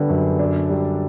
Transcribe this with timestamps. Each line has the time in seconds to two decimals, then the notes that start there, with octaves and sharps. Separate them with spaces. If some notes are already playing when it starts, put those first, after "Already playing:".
Already playing: D3 G3 B3
0.09 F#2
0.39 D4
0.70 G3